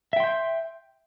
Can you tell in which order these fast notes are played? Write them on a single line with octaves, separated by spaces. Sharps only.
E5 G5 C6 G6